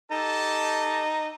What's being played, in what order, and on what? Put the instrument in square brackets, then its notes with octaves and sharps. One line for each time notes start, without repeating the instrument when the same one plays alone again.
[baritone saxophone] D#4 [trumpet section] G4 A4 A5